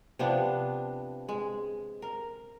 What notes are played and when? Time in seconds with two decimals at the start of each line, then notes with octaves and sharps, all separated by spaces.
0.19 C3 F3 B3 D4
1.29 G#3
2.02 A#4